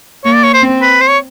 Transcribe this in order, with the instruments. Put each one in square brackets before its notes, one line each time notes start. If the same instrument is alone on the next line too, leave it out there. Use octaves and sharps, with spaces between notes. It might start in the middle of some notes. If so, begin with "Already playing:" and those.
[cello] A#3 [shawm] C#5
[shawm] D5
C#5
C5
[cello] C4
[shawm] B4
C5
C#5